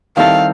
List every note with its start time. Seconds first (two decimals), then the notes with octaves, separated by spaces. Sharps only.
0.17 D#3 G3 C4 E4 A4 F5